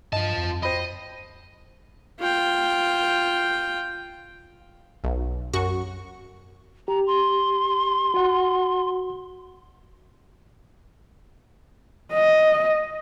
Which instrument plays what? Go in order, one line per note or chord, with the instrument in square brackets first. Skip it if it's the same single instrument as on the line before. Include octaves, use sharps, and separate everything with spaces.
[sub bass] G2 [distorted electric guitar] F4 A5 [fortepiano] D#5
[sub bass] F2
[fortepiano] C5 G5 B5 [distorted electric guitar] D#5
[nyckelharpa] F4 G5
[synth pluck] B1
F#2 F#4 C#6
[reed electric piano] G4 [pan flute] A#5
[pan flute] C6
[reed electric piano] F#4 F#5
[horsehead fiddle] D#5